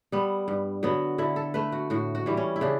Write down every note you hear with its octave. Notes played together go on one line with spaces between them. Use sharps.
G3 B3
G2
D3 F#3 B3
D3 E4
A4
A3 B4
F#4
A2 F#4
F#4
E3 G3
C#4
E4
C#3 D4